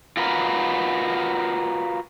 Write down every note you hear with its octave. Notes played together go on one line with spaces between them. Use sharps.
F4 F#4 A#4 B4